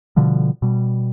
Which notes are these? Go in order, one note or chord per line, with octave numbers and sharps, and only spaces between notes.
B2 D3 F3 G3
B2 G3